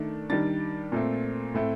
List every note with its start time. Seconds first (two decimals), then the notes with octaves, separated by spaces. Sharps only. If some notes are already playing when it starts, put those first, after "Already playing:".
Already playing: D#3 A3 D4
0.30 D#3 G3 D4 A6
0.92 A#2 A3 C4
1.54 A2 A3 C4